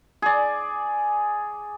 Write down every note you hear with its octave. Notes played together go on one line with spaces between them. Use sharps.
G#4 D5